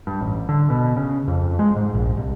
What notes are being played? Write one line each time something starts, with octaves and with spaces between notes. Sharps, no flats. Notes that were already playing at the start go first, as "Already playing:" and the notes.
G2
A1
D3
B2
C#3
F2
G#3
G#2
A#1
C2